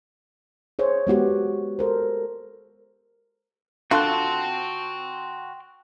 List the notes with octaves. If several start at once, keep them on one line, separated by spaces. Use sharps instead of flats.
G#4 C5 C#5
G#3 B3 F#4 G4
A4 A#4 C5
D3 F4 F#4 G5 A5 C6 F#6